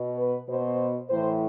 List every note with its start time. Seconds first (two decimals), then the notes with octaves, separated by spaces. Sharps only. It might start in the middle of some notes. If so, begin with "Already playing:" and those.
Already playing: B2
0.18 B4
0.48 B2 C5
1.10 A2 E3 C5